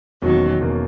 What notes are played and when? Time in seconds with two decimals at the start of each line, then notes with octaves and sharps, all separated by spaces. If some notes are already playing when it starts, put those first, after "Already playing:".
0.22 E1 E2 B2 D#3 F#3 A#3 C#4
0.60 E1 E2 B2 A#3 C#4